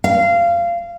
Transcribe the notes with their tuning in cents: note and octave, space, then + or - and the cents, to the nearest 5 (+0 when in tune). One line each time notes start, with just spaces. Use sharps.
F5 -20